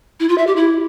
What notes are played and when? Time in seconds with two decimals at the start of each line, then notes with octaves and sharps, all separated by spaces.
0.20 E4
0.29 F4
0.38 E5
0.47 G4
0.56 E4